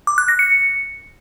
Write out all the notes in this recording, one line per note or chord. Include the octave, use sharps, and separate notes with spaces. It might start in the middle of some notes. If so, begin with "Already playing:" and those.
D6
F#6
A#6
C#7